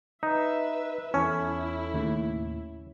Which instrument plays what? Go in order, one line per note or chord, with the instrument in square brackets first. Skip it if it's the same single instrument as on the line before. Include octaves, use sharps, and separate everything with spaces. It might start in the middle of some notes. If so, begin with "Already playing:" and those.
[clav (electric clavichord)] D#4 [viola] B4 E5
[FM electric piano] E2 A4 [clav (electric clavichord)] C#4 [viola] E4
[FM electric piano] D#2 A2 C#3